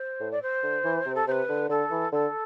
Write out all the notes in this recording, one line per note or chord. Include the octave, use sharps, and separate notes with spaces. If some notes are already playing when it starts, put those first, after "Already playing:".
Already playing: C5
A2
D5
C5
D3
E3
C3
A4
C3 B4 C5
D3
D3 A4
E3
D3 A4